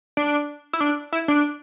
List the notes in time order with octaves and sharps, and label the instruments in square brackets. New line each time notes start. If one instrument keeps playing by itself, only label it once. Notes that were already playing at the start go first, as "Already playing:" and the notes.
[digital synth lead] D4
E4
D4
E4
D4